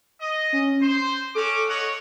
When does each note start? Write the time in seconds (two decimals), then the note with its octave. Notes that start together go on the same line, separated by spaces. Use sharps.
0.21 D#5
0.53 C#4
0.81 C5 C6
1.35 C#4 F#4 A4 D6
1.68 C#5 D#5 F#5